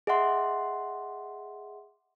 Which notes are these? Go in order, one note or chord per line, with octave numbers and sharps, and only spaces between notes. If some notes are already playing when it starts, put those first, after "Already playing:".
G#4 D#5 E5 F#5 C6